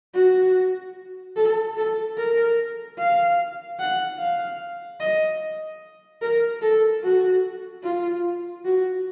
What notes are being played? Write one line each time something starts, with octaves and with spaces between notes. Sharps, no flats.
F#4
A4
A4
A#4
F5
F#5
F5
D#5
A#4
A4
F#4
F4
F#4